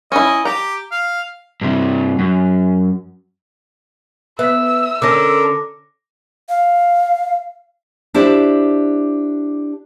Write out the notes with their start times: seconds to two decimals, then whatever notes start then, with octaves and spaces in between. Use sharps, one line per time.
0.12 C#4 E4 D#5
0.45 G4 A#5
0.92 F5
1.61 G2 C3
2.19 F#2
4.39 B3 E5 E6 B6
5.02 D3 C#4 A4 A#4 D6 A#6
6.49 F5
8.14 D4 E4 G4 C5 D5